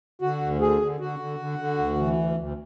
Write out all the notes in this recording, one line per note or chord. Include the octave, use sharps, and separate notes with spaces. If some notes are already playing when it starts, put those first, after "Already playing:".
D3 F#4
D2
D3 G#4
D3
D3 F#4
D3
D3
D3
D2
E3
D2
D2